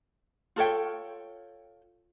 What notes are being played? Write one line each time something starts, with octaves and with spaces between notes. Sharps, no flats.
F4 A4 C#5 G5